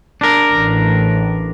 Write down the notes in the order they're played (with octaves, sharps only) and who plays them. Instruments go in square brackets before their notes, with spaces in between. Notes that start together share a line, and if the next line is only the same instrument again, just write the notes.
[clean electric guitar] D4 A#4
[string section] A1